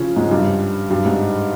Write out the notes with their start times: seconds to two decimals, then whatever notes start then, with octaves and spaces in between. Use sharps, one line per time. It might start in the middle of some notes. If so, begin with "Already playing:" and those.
Already playing: C#3 F3 C#4 F4
0.16 G#2 G#3
0.31 G2 G3
0.90 G2 G3
1.05 G#2 G#3